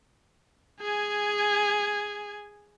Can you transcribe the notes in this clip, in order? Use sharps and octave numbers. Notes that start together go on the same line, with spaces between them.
G#4 G#5